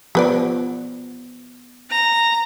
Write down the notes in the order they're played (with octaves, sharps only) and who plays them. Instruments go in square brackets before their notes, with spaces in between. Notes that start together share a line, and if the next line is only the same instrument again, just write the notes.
[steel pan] F3 B3 [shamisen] G4 B4 D5
[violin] A#5